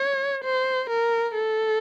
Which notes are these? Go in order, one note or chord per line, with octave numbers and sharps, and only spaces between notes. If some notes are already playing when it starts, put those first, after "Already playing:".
Already playing: C#5
C5
A#4
A4